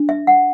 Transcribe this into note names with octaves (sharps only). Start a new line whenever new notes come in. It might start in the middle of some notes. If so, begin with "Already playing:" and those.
Already playing: D4
E5
F#5